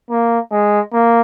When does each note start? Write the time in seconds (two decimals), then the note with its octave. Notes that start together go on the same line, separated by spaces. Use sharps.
0.10 A#3
0.51 G#3
0.93 A#3